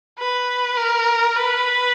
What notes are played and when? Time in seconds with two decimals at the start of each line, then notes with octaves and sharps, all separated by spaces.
0.19 B4
0.77 A#4
1.36 B4